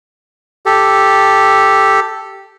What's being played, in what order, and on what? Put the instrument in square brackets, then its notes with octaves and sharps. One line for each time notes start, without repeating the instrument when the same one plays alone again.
[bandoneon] G4 A4